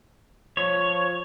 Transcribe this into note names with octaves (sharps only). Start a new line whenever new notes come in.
F3 C#5